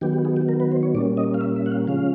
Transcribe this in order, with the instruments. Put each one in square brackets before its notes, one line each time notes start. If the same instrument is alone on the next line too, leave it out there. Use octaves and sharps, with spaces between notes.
[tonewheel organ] D#3 F#3 B3 G4
G4
G#4
G4
A#4
B4
C5
C#5
A#2 G3 A#3 C#4 D5
D#5
F5
E5
E5
F#5
F5
C#3 F3 G#3 C#4 F5